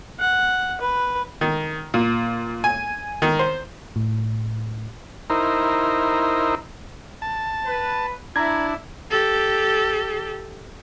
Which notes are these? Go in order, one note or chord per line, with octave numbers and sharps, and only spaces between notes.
F#5
B4
D#3
A#2
G#5
D#3
C5
A2
D#4 E4 A#4 C5
A5
B4
D4 E4 A#5 G#6
G4 A4